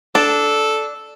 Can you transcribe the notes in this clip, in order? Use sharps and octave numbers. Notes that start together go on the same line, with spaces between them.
D4 A4